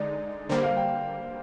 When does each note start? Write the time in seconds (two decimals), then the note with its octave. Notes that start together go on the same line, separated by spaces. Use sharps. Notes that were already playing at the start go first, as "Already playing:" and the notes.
Already playing: D3 G#3 D#4 D5
0.49 D3 G3 A#3 C5
0.63 F5
0.77 G5